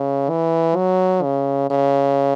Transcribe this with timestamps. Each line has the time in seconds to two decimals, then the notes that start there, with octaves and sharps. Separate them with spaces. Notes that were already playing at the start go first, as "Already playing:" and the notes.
Already playing: C#3
0.29 E3
0.76 F#3
1.23 C#3
1.70 C#3